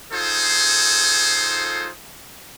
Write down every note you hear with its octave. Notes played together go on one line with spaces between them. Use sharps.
D#4 F4 G#4 A4 C5